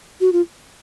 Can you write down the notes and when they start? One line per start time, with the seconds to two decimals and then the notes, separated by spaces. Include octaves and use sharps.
0.21 F#4
0.33 F4